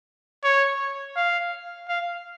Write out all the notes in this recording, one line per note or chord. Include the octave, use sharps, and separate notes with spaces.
C#5
F5
F5